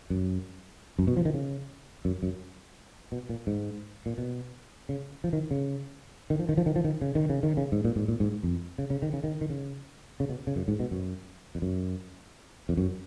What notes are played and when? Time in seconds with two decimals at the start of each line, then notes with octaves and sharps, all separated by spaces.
0.10 F#2
0.99 F#2
1.07 B2
1.17 F3
1.25 D#3
1.34 C#3
2.05 F#2
2.23 F#2
3.12 B2
3.29 A#2
3.47 G#2
4.06 A#2
4.18 B2
4.89 C#3
5.24 F3
5.33 D#3
5.51 C#3
6.30 D#3
6.39 F3
6.49 D#3
6.57 F3
6.66 D#3
6.76 F3
6.84 D#3
7.01 C#3
7.15 D#3
7.29 C#3
7.43 D#3
7.57 C#3
7.72 G#2
7.84 A#2
7.96 G#2
8.08 A#2
8.20 G#2
8.43 F2
8.78 C#3
8.90 C#3
9.02 D#3
9.13 C#3
9.24 D#3
9.41 D#3
9.50 C#3
10.20 C#3
10.29 B2
10.47 C#3
10.56 F#2
10.68 G#2
10.80 B2
10.91 F#2
11.55 F2
11.62 F#2
12.69 F2
12.77 F#2